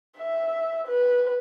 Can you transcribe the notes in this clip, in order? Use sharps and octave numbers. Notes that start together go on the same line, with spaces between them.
E5
B4